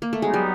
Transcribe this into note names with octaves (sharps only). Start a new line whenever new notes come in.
A#3
A3
F#3 G#3 B3 D#4
G3